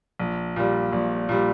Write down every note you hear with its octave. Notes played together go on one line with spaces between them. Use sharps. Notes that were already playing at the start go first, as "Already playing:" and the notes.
A#1
A#2 G3
A#1
A#2 G3